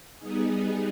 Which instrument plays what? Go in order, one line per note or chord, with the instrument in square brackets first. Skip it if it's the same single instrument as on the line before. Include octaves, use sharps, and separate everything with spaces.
[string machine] G3 B3 D#4 G#4